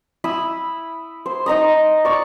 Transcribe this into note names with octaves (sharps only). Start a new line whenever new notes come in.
E4 B5 D#6 E6
C5
D#4 D#5 A#5 D#6
D5 C#6